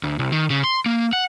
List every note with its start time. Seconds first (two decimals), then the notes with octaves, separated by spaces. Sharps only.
0.03 D2
0.19 C2
0.32 D#3
0.50 C#3
0.64 C6
0.86 A#3
1.13 F#5